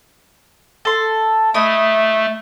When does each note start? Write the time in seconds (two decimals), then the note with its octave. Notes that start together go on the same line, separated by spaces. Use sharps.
0.85 A4 C6
1.54 A3 E4 D#5